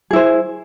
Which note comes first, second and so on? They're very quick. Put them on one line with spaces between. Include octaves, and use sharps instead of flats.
G#4 E4 C5